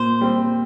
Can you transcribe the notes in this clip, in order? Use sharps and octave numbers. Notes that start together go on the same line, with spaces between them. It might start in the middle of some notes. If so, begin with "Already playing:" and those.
Already playing: A#2 C5
G3 C4